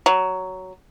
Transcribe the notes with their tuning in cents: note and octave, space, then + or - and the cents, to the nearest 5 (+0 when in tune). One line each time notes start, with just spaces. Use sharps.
F#3 +10